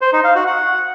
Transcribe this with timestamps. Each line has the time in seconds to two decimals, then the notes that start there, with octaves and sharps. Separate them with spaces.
0.01 C5
0.13 D#4
0.24 F5
0.35 F#4
0.47 F#5